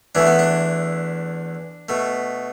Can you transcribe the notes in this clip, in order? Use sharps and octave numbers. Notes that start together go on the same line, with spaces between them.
E2 E3 A3 D4
B3
D4
B2 A3